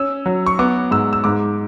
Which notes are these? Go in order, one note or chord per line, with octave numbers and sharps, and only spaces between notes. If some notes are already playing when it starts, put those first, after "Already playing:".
Already playing: C#4 E6
F#3
C#6
B3 D6
G#2 E6
E6
G#2 D6